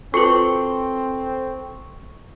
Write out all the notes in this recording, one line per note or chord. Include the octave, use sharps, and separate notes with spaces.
C4 F4 F#4 A4 B4 C#6